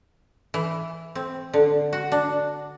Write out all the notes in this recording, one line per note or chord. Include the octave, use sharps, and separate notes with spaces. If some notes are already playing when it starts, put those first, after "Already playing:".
E3
C4
D3
F#4
D4